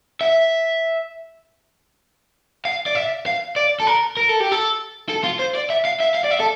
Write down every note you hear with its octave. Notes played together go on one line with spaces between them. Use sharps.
E5
F5
D5
E5
F5
D5
A4
A#4
A#4
A4
G4
A4
A4
F4
C5
D5
E5
F5
E5
F5
D5
E5
A4